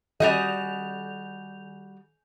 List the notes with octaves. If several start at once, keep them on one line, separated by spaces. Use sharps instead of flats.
D#3 G3 F#4 D#5 G6 F7